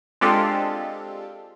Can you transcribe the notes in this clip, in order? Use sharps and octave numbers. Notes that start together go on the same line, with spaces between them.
G#3 C4 D4 F4 G4 A4